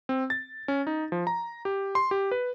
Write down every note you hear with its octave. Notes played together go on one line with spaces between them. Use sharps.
C4
A6
C#4
D#4
F3
A#5
G4
C6
G4
B4